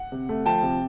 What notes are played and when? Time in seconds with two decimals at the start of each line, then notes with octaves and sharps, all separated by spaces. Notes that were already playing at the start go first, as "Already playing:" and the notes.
Already playing: F#5
0.12 C3
0.29 A3
0.46 F3 G5 A5
0.63 C3